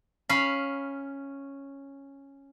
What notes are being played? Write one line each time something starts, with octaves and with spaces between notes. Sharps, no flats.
C#4 F5 B5